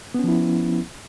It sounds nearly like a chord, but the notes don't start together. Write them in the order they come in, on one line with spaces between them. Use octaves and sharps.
B3 C#4 F3 E4